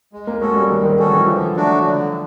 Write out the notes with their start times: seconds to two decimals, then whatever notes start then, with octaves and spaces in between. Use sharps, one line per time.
0.13 G#3
0.27 A#3
0.41 G#3 C#4 F#4 A4
0.56 G3
0.70 D#3 G#3
0.85 D#3
0.99 D#3 C#4 F#4 A4
1.13 E3
1.27 D3 F3
1.56 F#3 A3 D4 F#4
1.85 D3